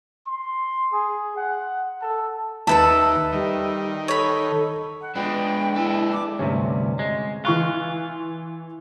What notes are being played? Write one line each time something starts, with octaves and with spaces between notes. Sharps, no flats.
C6
G#4
F#5
A4
D#2 A4 B4 E5 A5
D#3 G3
A4 C#5 B5
F#5
D3 F3 G#3 B3 D4 G5
G#3 E4 A4
D6
D2 G2 C3 C#4
G#3
E3 F4 C#6 F#6